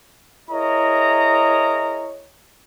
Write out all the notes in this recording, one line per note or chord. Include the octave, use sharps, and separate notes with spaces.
E4 G#4 A#4 C#5 D#5 A#5